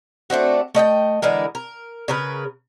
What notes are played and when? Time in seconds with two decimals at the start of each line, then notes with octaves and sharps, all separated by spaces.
0.30 A3 C4 D4 F#4
0.75 A3 D#5 F#5 G5
1.22 D3 E3 G#3 A#4
1.55 A#4
2.08 C#3 A#4 B4